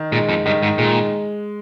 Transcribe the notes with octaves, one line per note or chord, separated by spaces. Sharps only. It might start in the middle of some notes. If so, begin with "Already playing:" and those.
Already playing: D#3
A#2 G#3
F2
G2 D#3
G#2
A#2 G#3